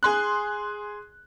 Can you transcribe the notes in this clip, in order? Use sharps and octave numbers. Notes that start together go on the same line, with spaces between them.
G#4 C6 F#6